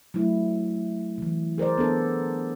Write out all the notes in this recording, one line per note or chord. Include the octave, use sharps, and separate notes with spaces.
F#3 A3 E4
C3 E3
G#4 A#4 C5 D5
B3 D4 A4